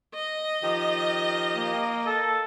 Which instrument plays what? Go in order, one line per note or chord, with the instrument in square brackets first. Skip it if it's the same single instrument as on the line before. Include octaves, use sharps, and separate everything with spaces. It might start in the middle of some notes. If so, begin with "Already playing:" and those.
[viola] D#5
[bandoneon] D#3 F3 G4
[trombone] A#3
[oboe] A4